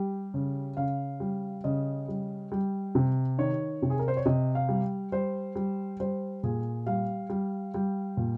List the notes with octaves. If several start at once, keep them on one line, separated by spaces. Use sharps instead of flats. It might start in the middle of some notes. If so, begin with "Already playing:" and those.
Already playing: G3 G4
C#3
C#3 F5
G3
C#3 D#5
G3
G3
C3
D#3 C#5
C3
G#4
A#4
C5
C#5
C3 D#5
F5
G3
G3 C5
G3
G3 C5
A#2 G#4
G3 F5
G3
G3
A#2